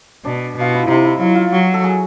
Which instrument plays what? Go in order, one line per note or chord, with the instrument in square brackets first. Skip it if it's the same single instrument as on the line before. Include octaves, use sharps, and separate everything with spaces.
[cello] B2 [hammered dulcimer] D4
[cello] B2 [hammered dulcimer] F4
[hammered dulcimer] E4
[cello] C3 [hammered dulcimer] D#4
[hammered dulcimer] E4
[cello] F#3 [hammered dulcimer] F4
[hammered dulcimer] F4
[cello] F#3 [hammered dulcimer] F#4
[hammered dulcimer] A4
G#4